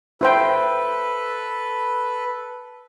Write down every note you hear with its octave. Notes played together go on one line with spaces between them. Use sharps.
E4 A4 B4 C5 G5